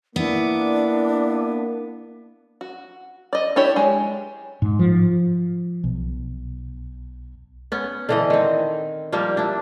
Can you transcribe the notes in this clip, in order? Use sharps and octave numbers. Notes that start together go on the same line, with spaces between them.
A#3 B3 D4 E4
F#4
D5 D#5
D4 E4 G4 C#5
G#3
G#2
F3
B1
B3 C#4
D3 E3 D#5
D#3 C4
F3 G3 A#3 C4
D4 E4